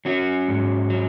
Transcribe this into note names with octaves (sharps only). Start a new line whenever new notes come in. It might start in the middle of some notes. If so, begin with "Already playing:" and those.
F#3 C#4 F#4
G#2
F#3